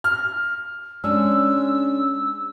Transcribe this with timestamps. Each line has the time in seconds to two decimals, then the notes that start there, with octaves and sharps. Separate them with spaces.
0.04 F6
1.04 G#3 C#4 D4 E6